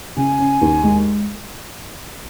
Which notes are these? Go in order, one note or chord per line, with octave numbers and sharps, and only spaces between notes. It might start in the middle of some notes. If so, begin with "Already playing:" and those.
C#3 G#5
C#4
D#2
G#3